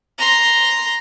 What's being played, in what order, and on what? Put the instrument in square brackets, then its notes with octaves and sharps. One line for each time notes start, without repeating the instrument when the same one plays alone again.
[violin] A#5 C6